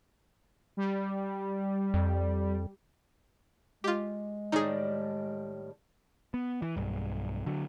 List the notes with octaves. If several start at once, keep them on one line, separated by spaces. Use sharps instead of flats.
G3
F2
G#3 F4 G4
A2 D#3 G3 D#4 G#4
B3
E3
B1 G2
D3 F#3